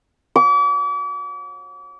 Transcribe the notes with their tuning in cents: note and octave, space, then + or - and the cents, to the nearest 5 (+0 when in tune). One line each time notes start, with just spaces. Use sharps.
D6 -40